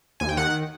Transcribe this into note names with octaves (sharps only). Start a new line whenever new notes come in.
D#2 G#5
G5
D#3 F#5